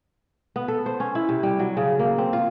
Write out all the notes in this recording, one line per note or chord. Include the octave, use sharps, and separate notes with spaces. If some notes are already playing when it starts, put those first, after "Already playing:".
B3
A4
C5
C#4
E4
C3
G3
F#3
C#3
A#3
C4
F4